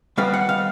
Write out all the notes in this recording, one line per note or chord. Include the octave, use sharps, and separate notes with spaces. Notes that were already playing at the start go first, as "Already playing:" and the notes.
D#3 G3 B3 F5
F#5
F5